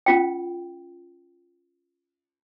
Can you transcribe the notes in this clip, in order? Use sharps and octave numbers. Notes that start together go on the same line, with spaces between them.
C#4 F4 G5